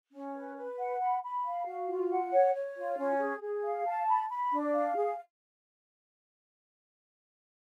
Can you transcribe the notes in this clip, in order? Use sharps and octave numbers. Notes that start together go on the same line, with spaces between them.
C#4
B4
B4
F#5
B5
B5
F5
F#4
F4
F#5
C#5
C#5
F4
C#4
G#4
G#4
F5
A5
B5
B5
D4
F5
G#4